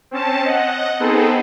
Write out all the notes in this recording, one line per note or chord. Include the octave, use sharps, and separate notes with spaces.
C4 C#4 A5
D#5 F#5
B3 C4 D#4 G#4 A4